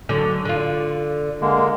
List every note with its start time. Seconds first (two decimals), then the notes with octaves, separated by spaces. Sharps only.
0.09 D3 F#3
0.45 D3 F4
1.41 D3 G#3 A#3